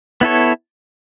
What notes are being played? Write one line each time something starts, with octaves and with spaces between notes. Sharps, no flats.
B3 E4 A4 C#5